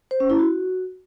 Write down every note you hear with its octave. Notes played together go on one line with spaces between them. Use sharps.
C5
C#4
E4
F#4